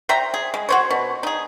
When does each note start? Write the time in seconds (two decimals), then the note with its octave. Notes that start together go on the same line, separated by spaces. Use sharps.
0.09 C5 E5 G5 A#5
0.34 G#4
0.54 G#3
0.69 F#4 C5 C#5
0.91 B2
1.23 D#4 G#4